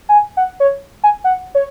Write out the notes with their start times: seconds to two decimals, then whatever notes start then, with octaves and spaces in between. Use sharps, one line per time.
0.09 G#5
0.37 F#5
0.60 C#5
1.04 G#5
1.24 F#5
1.55 C#5